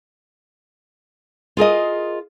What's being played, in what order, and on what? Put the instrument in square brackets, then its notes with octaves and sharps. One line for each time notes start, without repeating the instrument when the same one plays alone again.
[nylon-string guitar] F4 G#4 A#4 D#5